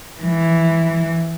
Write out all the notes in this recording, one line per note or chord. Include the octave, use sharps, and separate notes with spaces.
E3